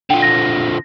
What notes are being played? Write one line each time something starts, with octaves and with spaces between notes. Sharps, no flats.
D3 F3 G5
A#6